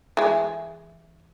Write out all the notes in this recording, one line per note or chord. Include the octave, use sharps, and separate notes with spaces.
E3 G#3